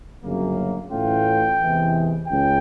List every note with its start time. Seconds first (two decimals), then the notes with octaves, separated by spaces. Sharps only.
0.23 G1 F#2 C#3 F#3 A#3
0.91 A2 E3 A3 C#4 F4 G5
1.60 E2 C3 E3 G#3
2.28 C#2 C#3 G5